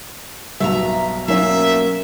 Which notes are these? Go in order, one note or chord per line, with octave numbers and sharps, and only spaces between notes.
B1 G2 B2 E5 F5 A#5
F#3 A#3 C#4 A#4 E5